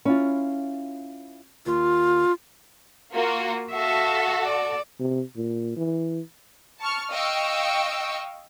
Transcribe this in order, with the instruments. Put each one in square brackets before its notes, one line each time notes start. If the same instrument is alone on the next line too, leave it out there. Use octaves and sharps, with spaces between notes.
[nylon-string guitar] C#4 E4 F4
[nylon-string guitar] D#2 [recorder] F4
[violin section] A#3 F4 F#4
[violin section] F#4 A4 [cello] E5 F5
[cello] D5
[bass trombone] C3
A#2
E3
[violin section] A5 C#6 F6
D#5 F5 G5 C#6 E6